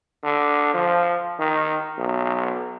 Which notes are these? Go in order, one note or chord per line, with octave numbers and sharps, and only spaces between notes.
D3
F3
D#3
B1